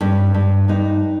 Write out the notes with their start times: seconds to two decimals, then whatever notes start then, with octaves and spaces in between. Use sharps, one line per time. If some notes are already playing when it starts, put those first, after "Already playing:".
0.01 G2 C#4
0.34 G2
0.68 G2 D#4